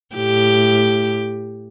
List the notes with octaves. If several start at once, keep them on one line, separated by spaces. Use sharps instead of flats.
A2 G4